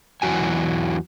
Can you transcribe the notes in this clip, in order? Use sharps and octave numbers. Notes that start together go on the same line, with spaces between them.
E2 E3 F#3 F#4 G#5